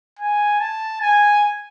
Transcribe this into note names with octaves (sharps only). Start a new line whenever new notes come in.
G#5
A5
G#5